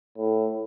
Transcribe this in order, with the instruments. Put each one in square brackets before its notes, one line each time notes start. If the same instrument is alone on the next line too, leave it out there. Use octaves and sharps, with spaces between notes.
[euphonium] A2